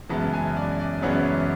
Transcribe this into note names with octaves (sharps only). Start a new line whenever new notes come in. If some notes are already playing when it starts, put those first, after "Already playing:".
F#2 C#3 E3 G#3 B3 A5
G#5
D5
D5
F#2 C#3 E3 G#3 B3 C#5